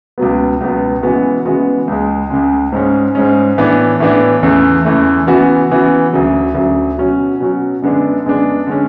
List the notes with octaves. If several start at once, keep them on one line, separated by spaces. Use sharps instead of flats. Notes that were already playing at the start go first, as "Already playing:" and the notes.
C#2 B2 F#3 B3
C#2 B2 F#3 B3
C#3 E3 G#3 B3 F#4
C#3 E3 G#3 B3 F#4
C#2 C#3 G#3
C#2 C#3 G#3
G#2 G#3 C#4
G#2 G#3 C#4
A2 E3 B3 D4
A2 E3 B3 D4
E2 C#3 E3 A3
E2 C#3 E3 A3
C#3 E3 B3 F#4
C#3 E3 B3 F#4
D2 C#3 F#3
D2 C#3 F#3
B2 F#3 C#4 F#4
B2 F#3 C#4 F#4
F#2 D3 G#3 B3 D4
F#2 D3 G#3 B3 D4
D3 G#3 C#4